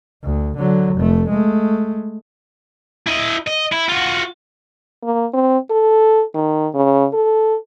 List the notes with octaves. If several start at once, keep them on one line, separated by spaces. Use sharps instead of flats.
D2
D3 F#3
F1 A3
G#3 A3
E4 D#5
D#5
E4
F4 F#4
A#3
C4
A4
D#3
C#3
A4